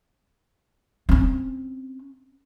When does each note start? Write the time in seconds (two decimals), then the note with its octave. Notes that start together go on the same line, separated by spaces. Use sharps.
1.09 C4 C#4